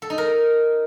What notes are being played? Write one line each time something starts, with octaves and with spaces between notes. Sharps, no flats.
A4
D#4
A#4